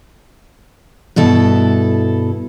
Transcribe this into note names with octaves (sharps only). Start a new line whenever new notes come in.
G2 B2 E4 A4